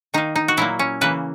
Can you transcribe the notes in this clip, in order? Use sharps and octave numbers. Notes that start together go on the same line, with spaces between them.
D#3 A#3 D#4
D#4
F#4
A#2 F#3 A#3 E4
C#4
C#3 E3 A#3 B4